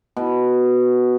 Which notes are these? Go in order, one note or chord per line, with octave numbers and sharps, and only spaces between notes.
B2